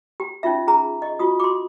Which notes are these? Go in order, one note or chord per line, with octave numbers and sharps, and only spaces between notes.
G4
C#4 D#4 F4 E5
G#4 A#5
D#5
F4 F#4 D#6
C6 D6